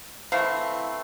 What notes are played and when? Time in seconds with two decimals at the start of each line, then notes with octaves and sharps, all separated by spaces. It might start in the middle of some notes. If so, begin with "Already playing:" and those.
0.32 E3 A3 C4 F5